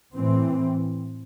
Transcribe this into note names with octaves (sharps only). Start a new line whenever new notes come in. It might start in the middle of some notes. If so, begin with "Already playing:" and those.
A2 E3 C4